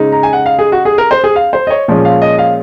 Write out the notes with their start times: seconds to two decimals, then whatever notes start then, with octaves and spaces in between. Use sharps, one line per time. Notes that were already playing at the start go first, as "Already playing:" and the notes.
Already playing: C#3 G#3 D#4
0.12 A#5
0.23 G#5
0.33 F#5
0.46 F5
0.59 G#4
0.72 F#4
0.85 G#4
0.98 A#4
1.11 C5
1.24 G#4
1.36 F5
1.53 C5
1.67 D#5
1.70 C#5
1.88 A#2 F3 G#3 C#4
2.05 F5
2.22 D#5
2.39 F5